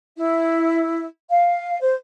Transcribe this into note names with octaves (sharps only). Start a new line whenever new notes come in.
E4
F5
C5